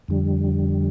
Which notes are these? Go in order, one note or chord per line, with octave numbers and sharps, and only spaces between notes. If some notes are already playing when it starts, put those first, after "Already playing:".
F2 D3 G3